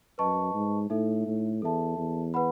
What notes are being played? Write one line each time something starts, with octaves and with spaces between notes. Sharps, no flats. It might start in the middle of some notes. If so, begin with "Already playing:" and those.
F#2 B4 D#5 A5 C#6
G#2
A2 D#4 A4 E5
A2
E2 A4 E5 A5
E2
B4 F#5 B5